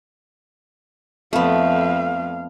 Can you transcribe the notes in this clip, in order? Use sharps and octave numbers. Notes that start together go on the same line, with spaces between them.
F2 A3 B3 F5